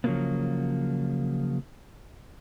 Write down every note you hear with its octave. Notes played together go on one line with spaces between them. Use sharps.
C#3 F3 F#3 G#3 A#3 B3